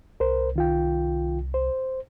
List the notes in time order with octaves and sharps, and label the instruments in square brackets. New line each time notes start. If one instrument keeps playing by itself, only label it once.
[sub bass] C2 [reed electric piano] A#4 C5
[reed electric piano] D#3 F4 G5
C5